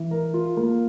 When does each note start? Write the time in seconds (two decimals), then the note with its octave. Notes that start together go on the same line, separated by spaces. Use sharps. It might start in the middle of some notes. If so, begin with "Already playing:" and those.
Already playing: E3
0.11 A#4
0.34 F4
0.57 A#3